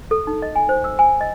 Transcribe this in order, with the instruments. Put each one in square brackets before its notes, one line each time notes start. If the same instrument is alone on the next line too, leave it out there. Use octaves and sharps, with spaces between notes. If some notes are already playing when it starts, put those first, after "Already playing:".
[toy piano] A4
D#4
D#5
G#5
C5
E6
G#5
D#5